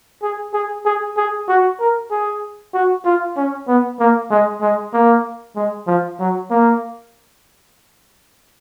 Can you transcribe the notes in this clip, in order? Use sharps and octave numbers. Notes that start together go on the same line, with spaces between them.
G#4
G#4
G#4
G#4
F#4
A#4
G#4
F#4
F4
C#4
B3
A#3
G#3
G#3
A#3
G#3
F3
F#3
A#3